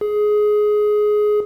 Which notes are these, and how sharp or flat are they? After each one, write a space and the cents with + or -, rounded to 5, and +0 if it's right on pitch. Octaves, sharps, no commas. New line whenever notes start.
G#4 +15